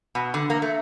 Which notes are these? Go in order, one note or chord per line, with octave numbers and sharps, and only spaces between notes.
B2
D3
A#3
A3